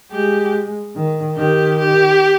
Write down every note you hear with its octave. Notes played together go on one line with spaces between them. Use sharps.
G#3 G4
D#3
D#3 G4
G4